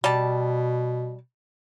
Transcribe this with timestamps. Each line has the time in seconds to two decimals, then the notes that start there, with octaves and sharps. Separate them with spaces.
0.04 B2 G3 A5